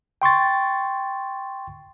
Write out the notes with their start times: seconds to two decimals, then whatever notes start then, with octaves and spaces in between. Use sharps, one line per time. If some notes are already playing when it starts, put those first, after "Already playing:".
0.22 G5 C6 C#6 A6